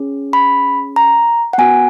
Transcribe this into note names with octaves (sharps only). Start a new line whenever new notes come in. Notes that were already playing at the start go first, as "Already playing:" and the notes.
Already playing: C#4 G#4
B5
A#5
F#5
B3 F#4 G#5